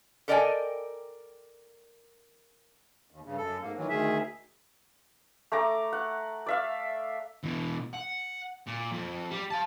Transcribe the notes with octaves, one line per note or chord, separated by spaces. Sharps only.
A4 A#4 D5 D#5 G5 G#5
D#2
G2 C#3
F#2 A4
G#2 A#3
D#3 E3 F#3
D2 D#3 G#4 E5
A3 A#5 D6
F#5
D5 E5 F5
B2 E3
F#5
A#2
F2
G3
F5 A5